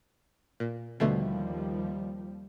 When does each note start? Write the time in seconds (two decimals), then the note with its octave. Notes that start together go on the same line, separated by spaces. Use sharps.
0.60 A#2
1.00 D#2 B2 D3 F3 G3 A3